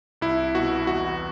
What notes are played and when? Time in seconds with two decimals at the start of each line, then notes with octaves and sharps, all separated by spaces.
0.21 C2 E4
0.55 B2 F#4
0.87 E2 F#4